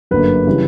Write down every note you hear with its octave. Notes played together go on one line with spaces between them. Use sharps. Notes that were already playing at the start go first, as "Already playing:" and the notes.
G1 F#2 D3 A#3 B4
C#3 E3 G3